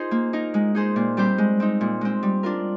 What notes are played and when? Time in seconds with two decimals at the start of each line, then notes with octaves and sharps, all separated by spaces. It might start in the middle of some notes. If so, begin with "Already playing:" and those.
Already playing: D#4 F4 G#4 A#4 C5
0.11 A#3
0.33 D#4 A#4
0.54 G#3
0.75 D#4 G#4 C5
0.96 A#2
1.17 G3 C4 G4 C5
1.38 G#3
1.60 C4 D#4
1.81 A#2
2.01 G#3 C4
2.23 G3
2.43 D4 F4 A#4